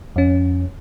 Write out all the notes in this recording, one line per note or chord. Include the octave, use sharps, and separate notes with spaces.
F2 C#4